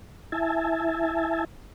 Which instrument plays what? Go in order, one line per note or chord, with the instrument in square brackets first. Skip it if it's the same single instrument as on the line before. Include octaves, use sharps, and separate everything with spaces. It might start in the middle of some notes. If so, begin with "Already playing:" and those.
[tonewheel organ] E4 E5 G#5 A5